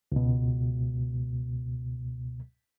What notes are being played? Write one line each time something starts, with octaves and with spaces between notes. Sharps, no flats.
C#2 B2